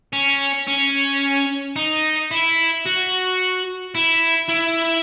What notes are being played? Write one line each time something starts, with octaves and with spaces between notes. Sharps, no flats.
C#4
C#4
D#4
E4
F#4
E4
E4